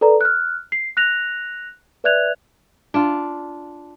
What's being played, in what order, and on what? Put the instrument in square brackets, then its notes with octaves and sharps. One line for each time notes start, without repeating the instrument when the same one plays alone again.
[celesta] A4 B4 D5 A#5
F6 F#6
C7
F#6 A#6 F7
B4 D5 E5 F#6 G#6 F7
[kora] D4 F4